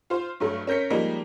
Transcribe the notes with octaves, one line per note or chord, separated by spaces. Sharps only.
F4 C5
G2 F#3 A3
C#4 A#4 G6 B6 C#7
F3 G3 G#3 A#3 D#4